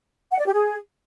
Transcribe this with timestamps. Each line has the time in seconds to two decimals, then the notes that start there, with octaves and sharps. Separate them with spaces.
0.31 F#5
0.38 D5
0.46 G4
0.53 G#4